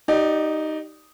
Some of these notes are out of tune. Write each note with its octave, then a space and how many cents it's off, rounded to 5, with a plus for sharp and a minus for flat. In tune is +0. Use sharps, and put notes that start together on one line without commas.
D#4 +0 G4 -25 D5 +20